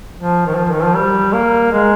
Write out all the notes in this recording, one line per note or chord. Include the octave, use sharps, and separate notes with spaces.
F3
D#3
F3
D#3
F3
G3
A#3
G#3